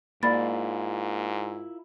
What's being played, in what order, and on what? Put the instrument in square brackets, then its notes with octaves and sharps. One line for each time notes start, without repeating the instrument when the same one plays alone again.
[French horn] G#2 [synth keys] A#3 [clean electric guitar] E4 F4 A#4 [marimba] D5 B5 A6